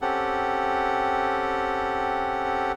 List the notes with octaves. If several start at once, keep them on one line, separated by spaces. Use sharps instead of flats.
C4 C#4 G4 A4 F#5